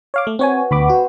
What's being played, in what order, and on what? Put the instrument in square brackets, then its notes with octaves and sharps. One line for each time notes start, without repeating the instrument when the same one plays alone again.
[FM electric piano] C#5 F5 D6
A3
[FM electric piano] C4 C#5 G#5 [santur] F#4 B4 A#5
[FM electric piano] D2 B5 D6 [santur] G3 B3 F#4
[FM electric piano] F#4 [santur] C5 B5